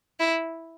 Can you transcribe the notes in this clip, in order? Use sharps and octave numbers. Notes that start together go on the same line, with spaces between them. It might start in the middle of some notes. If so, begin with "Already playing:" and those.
E4